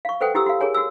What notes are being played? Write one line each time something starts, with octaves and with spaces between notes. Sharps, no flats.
F5 C#6
A4 B4 C5 F#5 G5 D#6
E4 G4 D#6 E6
F#4 F5
G#4 A#4 C#5 G#5
F#4 E6